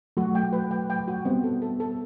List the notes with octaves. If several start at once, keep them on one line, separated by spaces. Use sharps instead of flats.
F#3 A3 F#4
G5
B4
G5
G5
F#4
G3 B3 C4
A4
A4
A4